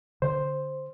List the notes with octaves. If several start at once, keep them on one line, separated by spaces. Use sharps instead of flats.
D3 C5